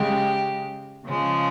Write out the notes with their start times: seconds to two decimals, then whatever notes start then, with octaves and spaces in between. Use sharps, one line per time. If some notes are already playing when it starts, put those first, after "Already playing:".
Already playing: C#3 G#3 G4
1.05 C#3 F3 G#3